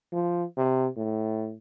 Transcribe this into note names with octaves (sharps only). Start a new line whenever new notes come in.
F3
C3
A2